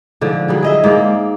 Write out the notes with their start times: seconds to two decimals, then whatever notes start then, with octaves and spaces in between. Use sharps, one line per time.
0.21 G#2 D3 F3
0.48 F#3 G3 G#4
0.62 G#4 D#5 E5
0.84 G#2 A#3 D5